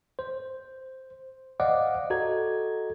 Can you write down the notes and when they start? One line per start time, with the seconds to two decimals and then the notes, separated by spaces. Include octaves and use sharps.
0.19 C5
1.60 C5 D5 D#5 F5 F#5 D6
2.10 F#4 A4 D#5 A#5 G#6